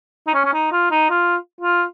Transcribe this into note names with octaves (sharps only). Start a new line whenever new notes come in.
D#4
C#4
C#4
D#4
F4
D#4
F4
F4